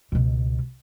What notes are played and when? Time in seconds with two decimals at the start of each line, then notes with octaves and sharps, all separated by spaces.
0.12 C#2 B2